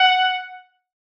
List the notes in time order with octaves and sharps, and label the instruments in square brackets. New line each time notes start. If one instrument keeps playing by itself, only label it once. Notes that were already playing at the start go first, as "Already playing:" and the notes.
Already playing: [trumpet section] F#5